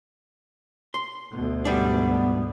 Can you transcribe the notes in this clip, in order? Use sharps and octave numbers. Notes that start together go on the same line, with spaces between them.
C6
D2 B2
G#2 G3 B3 D4